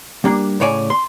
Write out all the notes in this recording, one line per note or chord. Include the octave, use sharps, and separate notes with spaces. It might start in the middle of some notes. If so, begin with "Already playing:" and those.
G3 A#3 D4
A2 C#3 C#5 D5 G#5
C6